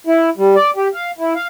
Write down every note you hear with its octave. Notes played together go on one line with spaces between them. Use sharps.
E4
G3
D5
G4
F5
E4
F5